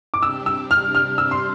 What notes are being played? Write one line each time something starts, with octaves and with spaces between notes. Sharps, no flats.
D6
C3 G3 D4 G4 E6
E6
F6
F6
E6
C6